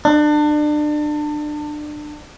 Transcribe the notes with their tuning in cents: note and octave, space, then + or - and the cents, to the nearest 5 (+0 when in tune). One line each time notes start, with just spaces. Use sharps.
D4 +30